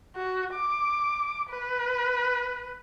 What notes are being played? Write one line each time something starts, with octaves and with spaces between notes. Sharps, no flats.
F#4
D6
B4